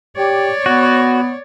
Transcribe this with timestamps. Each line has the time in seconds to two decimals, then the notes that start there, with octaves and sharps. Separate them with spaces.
0.17 G4 C#5 D5
0.66 B3 F#4